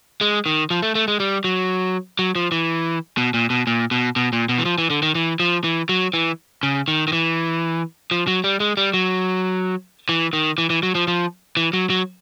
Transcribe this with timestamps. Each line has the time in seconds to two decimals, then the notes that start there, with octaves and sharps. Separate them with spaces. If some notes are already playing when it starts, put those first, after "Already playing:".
0.21 G#3
0.46 D#3
0.70 F3
0.82 A3
0.95 A3
1.08 G#3
1.20 G3
1.44 F#3
2.19 F#3
2.35 F3
2.52 E3
3.17 B2
3.34 A#2
3.50 B2
3.67 A#2
3.91 B2
4.16 B2
4.33 A#2
4.49 B2
4.58 E3
4.65 F3
4.78 E3
4.90 D3
5.02 D#3
5.15 E3
5.40 F3
5.64 E3
5.89 F#3
6.14 E3
6.63 C#3
6.88 D#3
7.08 D#3
7.13 E3
8.11 F3
8.27 F#3
8.44 G3
8.60 G#3
8.77 G3
8.94 F#3
10.09 E3
10.33 D#3
10.58 E3
10.70 E3
10.83 F#3
10.95 F3
11.08 F3
11.57 E3
11.73 F#3
11.90 F#3